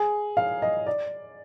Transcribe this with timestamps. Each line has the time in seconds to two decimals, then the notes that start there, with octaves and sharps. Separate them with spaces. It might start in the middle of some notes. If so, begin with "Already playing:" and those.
Already playing: G#4
0.37 F5
0.62 D#5
0.87 D5